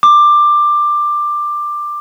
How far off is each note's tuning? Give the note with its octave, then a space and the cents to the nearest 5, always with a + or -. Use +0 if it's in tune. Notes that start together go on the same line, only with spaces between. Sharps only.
D6 +15